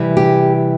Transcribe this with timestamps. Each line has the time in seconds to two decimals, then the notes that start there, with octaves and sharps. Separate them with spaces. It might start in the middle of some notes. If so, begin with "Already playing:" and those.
Already playing: C3 E3 G3
0.17 G4